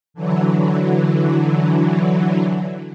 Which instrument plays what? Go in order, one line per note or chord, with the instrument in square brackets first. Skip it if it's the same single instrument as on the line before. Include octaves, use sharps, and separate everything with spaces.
[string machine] D3 E3 F#3